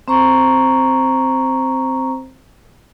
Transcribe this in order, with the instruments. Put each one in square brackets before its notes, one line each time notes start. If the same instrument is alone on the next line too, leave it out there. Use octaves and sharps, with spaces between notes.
[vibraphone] C4 C5 A#5 C#6